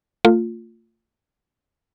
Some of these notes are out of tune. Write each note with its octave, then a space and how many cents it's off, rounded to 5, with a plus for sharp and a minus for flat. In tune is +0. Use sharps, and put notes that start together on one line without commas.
A3 +40 F4 +0